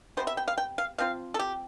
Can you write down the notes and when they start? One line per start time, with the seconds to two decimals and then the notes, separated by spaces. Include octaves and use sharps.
0.17 C3 G3 B3 C5
0.27 E5
0.37 G5
0.48 F5
0.58 G5
0.78 F5
0.98 F3 C4 F4 F5
1.34 A4
1.39 G4